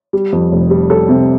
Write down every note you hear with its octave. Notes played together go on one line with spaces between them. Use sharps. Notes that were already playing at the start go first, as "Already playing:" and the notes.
G3
F2
F1
G3
G3 A4
C3